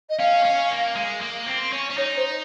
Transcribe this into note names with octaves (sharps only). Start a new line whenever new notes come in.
D#5
C#4 F5
C#4
A#3
G#3
A#3
C4
C#4
C#4
D#4 C#5
C5